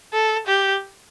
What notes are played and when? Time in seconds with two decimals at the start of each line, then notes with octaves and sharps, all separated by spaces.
0.13 A4
0.47 G4